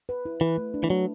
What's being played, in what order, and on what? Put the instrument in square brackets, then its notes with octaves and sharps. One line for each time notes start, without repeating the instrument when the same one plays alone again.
[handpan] B4
E4
[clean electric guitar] E3 [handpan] B4
[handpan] A3
D4
[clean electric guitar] E3
[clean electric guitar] F#3 [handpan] A3